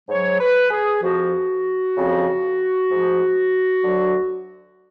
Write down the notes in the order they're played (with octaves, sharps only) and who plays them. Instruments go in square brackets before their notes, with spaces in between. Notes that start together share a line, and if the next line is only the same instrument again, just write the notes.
[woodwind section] G#2 F#3 C#5
B4
G#4
F2 F3 F#4
F2 C#3 F3
G#2 F3
D2 D3 F#3